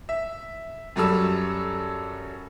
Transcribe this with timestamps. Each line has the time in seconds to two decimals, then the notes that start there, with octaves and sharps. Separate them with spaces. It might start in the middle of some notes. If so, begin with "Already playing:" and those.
0.09 E5
0.96 F#2 F#3 G3 A4 E6